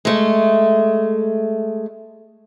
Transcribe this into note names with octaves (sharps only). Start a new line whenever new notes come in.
G#3 A3